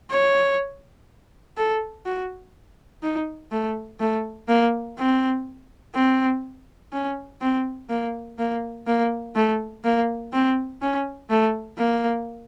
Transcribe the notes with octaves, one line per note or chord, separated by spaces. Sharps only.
C#5
A4
F#4
D#4
A3
A3
A#3
C4
C4
C#4
C4
A#3
A#3
A#3
A3
A#3
C4
C#4
A3
A#3